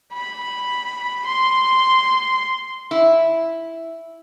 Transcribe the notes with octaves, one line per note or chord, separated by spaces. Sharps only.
B5
C6
E4